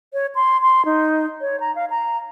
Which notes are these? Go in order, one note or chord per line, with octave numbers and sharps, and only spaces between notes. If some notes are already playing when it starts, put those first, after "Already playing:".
C#5
C6
C6
D#4
C#5
A#5
F5
A#5